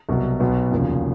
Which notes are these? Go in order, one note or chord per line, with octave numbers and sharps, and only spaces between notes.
C2 B2 F#3
B1 B2 F#3 B3
F1 D#2 C#3 F3